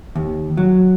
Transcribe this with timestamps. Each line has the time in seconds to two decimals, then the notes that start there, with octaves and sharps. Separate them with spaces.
0.16 D#2
0.57 F#3